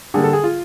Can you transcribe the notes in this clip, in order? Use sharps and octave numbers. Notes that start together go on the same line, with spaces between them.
D3 G3 A#3 G#4
A4
G#4
F4